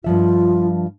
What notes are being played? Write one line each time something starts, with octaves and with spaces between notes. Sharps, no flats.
G2 F3 F4 E5